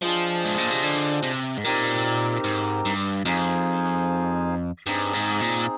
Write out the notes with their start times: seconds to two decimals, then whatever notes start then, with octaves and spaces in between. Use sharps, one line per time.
0.02 F3 D4 F4 G#4 C5 D#5
0.44 G#2
0.58 A#2
0.71 C3
0.83 D3
1.23 C3
1.58 G#2
1.64 A#2 C4 D#4 G4 A#4
2.44 G#2
2.85 G2
3.25 F2 D#4 G#4 C5 F5 G#5
4.87 G2 C4 D#4 G#4
5.14 G#2
5.41 A#2